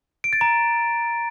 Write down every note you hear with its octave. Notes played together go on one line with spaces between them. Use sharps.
D7
A6
A#5